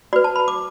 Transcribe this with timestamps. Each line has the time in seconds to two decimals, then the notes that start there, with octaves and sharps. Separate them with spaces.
0.13 F#4 B4 D5
0.24 A5
0.36 B5
0.48 D6